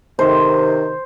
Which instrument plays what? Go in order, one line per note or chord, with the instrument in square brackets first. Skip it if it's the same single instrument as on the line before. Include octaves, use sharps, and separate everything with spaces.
[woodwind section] C3 D#3 [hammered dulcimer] C5